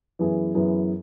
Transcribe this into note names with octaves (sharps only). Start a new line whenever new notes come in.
F#2 E3 B3 E4 G#4
F#2 E3 B3 E4 G#4